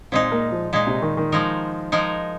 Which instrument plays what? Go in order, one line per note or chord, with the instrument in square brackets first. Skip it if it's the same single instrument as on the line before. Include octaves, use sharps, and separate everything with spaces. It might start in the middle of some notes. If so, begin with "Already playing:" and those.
[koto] A#2 G#3 D#4 [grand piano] C4
[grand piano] A#3
F3
[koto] A#2 G#3 D#4
[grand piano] C3
D#3
D#3
[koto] F3 G#3 D#4 A#4
F3 G#3 D#4 A#4